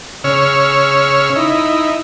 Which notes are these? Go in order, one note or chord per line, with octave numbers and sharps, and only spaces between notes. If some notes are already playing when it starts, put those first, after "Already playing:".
C#3 C#5 E6 F6
D#4 E4